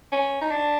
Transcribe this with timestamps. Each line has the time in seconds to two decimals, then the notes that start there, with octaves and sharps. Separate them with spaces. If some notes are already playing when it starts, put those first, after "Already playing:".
0.12 C#4
0.41 D#4
0.51 D4